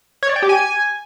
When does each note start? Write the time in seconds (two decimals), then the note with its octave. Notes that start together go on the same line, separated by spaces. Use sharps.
0.23 C#5
0.29 D5
0.36 G5
0.42 G4
0.49 G#5